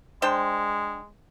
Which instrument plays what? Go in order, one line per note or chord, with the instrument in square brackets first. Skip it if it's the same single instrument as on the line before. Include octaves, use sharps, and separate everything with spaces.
[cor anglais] G#3 [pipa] D4 C5 G5